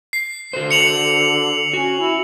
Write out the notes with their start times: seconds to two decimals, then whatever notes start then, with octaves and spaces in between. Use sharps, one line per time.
0.13 C7
0.53 D3 F#4 A4 C5
0.71 C#7 F7 F#7
1.73 C#4 F#4
2.00 E4